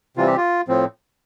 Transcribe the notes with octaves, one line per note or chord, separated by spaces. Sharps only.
C3 E3 G3 C4 F4
G4
F4
A2 F3 C4